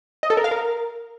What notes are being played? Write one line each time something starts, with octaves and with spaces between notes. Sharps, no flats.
D#5
A4
A#4
F5
A#4